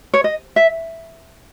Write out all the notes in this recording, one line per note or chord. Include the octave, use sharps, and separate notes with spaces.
C#5
D#5
E5